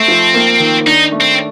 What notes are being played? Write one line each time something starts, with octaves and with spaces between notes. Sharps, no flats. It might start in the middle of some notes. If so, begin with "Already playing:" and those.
Already playing: A3 C4
F3
A#3
D#3
D4 D#4
A3
C4